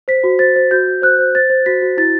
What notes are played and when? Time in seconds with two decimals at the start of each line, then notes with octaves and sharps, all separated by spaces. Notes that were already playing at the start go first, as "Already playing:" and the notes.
0.08 C5 B6
0.24 F#4
0.39 C5 A6
0.56 C5
0.71 F#4 G6
0.87 F#4
1.02 C5 F#6
1.18 C5
1.35 C5 A6
1.50 C5
1.66 F#4 B6
1.82 F#4
1.97 E4 A6